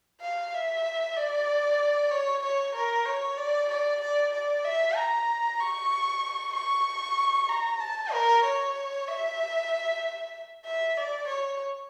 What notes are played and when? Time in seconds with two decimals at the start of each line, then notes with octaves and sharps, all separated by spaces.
0.21 F5
0.54 E5
1.17 D5
2.11 C#5
2.43 C#5
2.75 A#4
3.06 C#5
3.37 D5
3.69 D5
4.01 D5
4.33 D5
4.65 E5
4.96 A#5
5.60 C#6
6.54 C#6
7.49 A#5
7.80 A5
8.12 A#4
8.44 C#5
9.07 E5
10.65 E5
10.97 D5
11.28 C#5